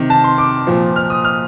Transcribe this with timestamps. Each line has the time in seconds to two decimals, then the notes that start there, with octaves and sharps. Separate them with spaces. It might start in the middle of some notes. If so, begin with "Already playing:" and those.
Already playing: C3 D#3
0.10 A5
0.24 C6
0.38 D6
0.67 A#2 F3
0.96 F6
1.10 D#6
1.25 F6